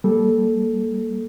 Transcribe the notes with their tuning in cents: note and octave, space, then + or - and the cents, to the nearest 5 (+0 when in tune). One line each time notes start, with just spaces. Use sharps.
G3 +0 A#3 +0 A4 -10